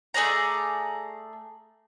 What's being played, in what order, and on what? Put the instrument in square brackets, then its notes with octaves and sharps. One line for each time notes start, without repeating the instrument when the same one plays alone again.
[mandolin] A3 G#4 D5 A#5